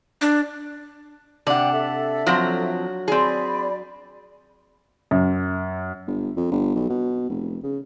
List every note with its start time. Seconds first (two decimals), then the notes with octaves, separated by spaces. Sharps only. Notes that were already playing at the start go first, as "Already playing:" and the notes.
0.21 D4
1.47 C3 D4 F#5 G5 A5
1.72 A4 E5
2.27 F3 F#3 C4 F#4 A#5
3.08 C4 G#4 D5 B5
5.11 F#2
6.08 G1
6.37 F2
6.52 G1
6.75 B1
6.90 B2
7.29 F1
7.64 C#3